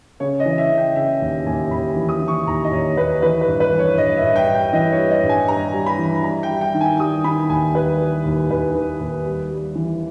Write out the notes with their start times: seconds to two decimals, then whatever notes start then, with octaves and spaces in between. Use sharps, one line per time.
0.20 C#3 C#5
0.40 D#5
0.45 E3
0.58 E5
0.71 C#3
0.78 G5
0.96 C#3 E5
1.21 D#2
1.46 D#2 G#5
1.71 D#2 B5
1.96 E3
2.09 D#6
2.22 E3
2.28 C#6
2.47 D#2 A#5
2.64 D#5
2.72 D#2 C#5
2.97 D#2 B4
3.22 E3 B4
3.41 B4
3.47 G2
3.60 B4
3.73 E3
3.79 C#5
3.98 G2 D#5
4.17 E5
4.23 G2
4.36 G5
4.48 G2
4.54 G5
4.73 E3 D#5
4.92 C#5
4.98 G3
5.10 D#5
5.23 G2
5.29 G#5
5.48 G2 A#5
5.73 G3
5.86 B5
5.98 E3
6.23 G3 A#5
6.43 G5
6.49 G3
6.61 G5
6.74 D#3
6.81 G#5
6.99 G3 D#6
7.24 D#3 B5
7.49 D#2 G#5
7.75 G3 B4
8.00 G3
8.25 D#2
8.50 D#2 B4
8.75 D#3
9.00 D#2
9.26 G3
9.50 G3
9.75 E3